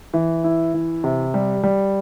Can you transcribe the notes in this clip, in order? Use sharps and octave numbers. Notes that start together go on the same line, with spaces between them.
E3
E4
E3
C3
G3
G3